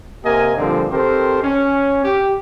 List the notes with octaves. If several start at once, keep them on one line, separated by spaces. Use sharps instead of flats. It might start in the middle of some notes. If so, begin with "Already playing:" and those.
C3 A#3 G4 A#4 D#5 G#5
A#2 D3 F3 G3 A#3 C4
D#3 C4 G4 A4 A#4 C5
C#4
G4